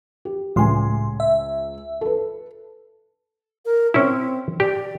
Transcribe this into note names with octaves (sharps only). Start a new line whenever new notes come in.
G4
C#2 A2 G#5 C6
E5
A4 B4
A#4
C4 C#4 E4
G4 D5